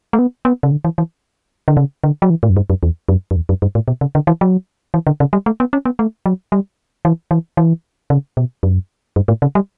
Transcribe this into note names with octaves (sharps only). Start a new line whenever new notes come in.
A3
B3
B3
C#3
D3
E3
E3
D3
C#3
D3
F#3
E3
A2
F#2
G2
F#2
E2
F#2
F#2
E2
F#2
G2
A2
B2
C#3
D3
E3
F#3
E3
D3
C#3
G3
A3
B3
C#4
B3
A3
F#3
G3
E3
E3
E3
C#3
B2
F#2
G2
A2
C#3
G3